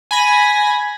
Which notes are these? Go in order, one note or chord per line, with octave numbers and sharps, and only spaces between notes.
G#5 B5 A#6